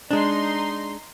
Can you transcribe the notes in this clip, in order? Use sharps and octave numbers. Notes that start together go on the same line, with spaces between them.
G#3 D4 D#4 C6